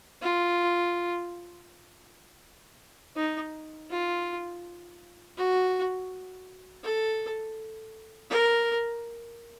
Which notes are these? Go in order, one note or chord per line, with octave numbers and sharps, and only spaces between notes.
F4
D#4
F4
F#4
A4
A#4